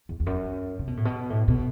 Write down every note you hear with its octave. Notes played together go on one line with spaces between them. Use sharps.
E2
E2
F#2
C3
B2
A2
B2
A2
B2